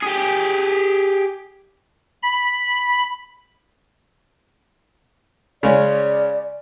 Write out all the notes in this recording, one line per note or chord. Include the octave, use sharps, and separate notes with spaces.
G4 G#4
B5
C#3 G#3 C#4 D5